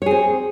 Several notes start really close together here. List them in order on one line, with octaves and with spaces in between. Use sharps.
C#5 G#4 C4